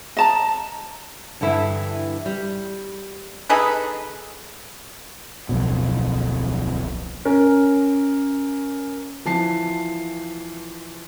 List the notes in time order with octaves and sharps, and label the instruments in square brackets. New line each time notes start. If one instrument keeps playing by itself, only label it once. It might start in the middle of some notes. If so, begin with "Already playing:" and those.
[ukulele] D#5 A5 A#5
[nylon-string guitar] G2 D3 E3 E4
G3
[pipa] D#4 G#4 A4 B4
[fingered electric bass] D1 B1 F2 B2
[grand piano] C#4 A#4
[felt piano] E3 F3 A5 C7